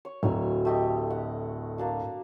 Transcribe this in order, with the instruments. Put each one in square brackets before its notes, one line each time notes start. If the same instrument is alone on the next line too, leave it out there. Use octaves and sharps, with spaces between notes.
[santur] C#5
[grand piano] D1 [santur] F#3 G#5
[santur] A3 G4 D#5
F#5
A#3 D4 F#4